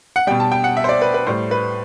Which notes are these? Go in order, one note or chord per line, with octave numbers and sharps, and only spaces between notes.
F#5
B2 G3 G5
A5
G5
F#5
E5
C5
D5
B4
B4
A2 G3 C5
B4